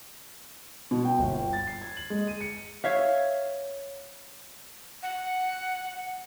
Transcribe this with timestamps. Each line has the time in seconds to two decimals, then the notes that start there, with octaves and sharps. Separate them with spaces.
0.91 B2
1.05 G5
1.19 G1
1.34 G5
1.53 A6
1.67 C7
1.82 G#6
1.97 F#7
2.10 G#3
2.27 D#7
2.41 C#7
2.84 C#5 E5 F5
5.03 F#5